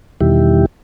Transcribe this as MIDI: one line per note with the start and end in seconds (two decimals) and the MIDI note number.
0.21 0.66 40
0.21 0.66 47
0.21 0.66 51
0.21 0.66 55
0.21 0.66 64
0.21 0.66 67